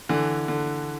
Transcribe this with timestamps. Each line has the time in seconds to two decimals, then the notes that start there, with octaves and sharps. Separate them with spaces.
0.09 D3 E3
0.48 D3